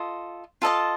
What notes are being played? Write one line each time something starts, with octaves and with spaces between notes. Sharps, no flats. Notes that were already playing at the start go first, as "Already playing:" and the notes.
Already playing: F4 A4 D#5
F4 A4 D#5 A5